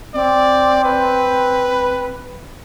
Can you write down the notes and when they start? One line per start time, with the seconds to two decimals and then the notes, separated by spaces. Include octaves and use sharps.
0.14 C4 D5
0.84 B4